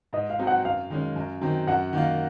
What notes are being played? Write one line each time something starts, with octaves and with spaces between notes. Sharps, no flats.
G#2 D#5
F5
F#3 C4 D#4
F#5
F#2 F5
D#3 G#3 C#4
F#2
D#3 F#3 C4
F#2 F#5
D#3 A#3 F4